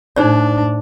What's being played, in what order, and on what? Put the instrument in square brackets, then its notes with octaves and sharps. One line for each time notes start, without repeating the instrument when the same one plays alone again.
[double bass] A2 D4 [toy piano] D#4 C5 D5